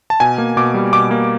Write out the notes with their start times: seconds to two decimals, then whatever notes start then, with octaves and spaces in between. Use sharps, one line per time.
0.10 A5
0.20 B2 G#5
0.38 A#3
0.57 B2 D6
0.74 G3
0.93 B2 D6
1.11 A#3